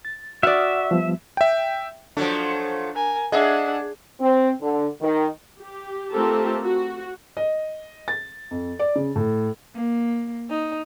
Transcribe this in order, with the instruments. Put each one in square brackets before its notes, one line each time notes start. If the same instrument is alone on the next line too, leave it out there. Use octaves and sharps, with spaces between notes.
[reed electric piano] A6
[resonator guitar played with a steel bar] F#4 D5 [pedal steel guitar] E5 [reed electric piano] D#6 F6
[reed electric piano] F3 G3 B3
[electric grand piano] E5 G5
[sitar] F3 F#3 A3 [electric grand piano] D4
[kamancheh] A#4 G#5
[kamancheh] D4 F#5 [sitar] G#4 [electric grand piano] D#5 E5
[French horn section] C4
D3
D#3
[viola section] G4
A3 C4 F4 G4 A4 A#4
F#4
[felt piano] D#5
A6
F2
D5
C#3
A2
[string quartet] A#3
D#4